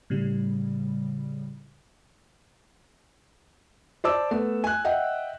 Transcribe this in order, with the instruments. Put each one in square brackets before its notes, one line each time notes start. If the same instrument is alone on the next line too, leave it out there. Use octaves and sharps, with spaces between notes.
[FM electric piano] A2 C#3 G3
[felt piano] C5 D5 A5 D6 E6
A3 B3
G#5 F#6
D#5 E5 F#5 G5